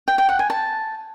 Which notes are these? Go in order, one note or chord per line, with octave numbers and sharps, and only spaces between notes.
G5
G5
F#5
G#5
A5